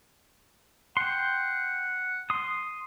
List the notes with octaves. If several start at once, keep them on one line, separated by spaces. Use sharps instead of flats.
F#5 G5 C6
C6 D#6